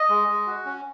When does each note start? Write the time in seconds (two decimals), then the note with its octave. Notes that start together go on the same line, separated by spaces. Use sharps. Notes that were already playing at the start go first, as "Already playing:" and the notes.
Already playing: D#5
0.10 G#3
0.28 G#3
0.47 F#4
0.65 C#4